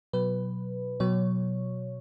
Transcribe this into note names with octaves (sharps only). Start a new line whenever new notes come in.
B2 F#3 B4
B2 F#3 C#5